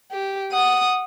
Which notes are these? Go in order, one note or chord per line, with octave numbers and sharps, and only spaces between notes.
G4
F#5 D#6